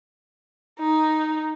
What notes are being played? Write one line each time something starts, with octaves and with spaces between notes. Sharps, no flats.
D#4